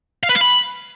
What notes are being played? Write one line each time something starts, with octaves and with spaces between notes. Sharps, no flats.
F5
B4
F5
B5